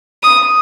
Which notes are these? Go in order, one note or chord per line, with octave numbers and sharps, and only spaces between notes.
D#6